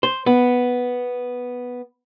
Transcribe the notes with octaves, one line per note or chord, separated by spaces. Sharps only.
C5
B3